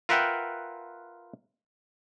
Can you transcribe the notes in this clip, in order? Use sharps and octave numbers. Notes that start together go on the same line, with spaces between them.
F4 A#4 B4 E5 F#5 G5